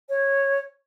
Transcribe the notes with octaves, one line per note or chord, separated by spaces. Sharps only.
C#5